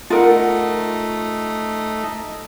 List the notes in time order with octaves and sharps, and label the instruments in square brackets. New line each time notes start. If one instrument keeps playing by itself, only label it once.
[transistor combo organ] A3 D#4 [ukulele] F4 A#4 F#5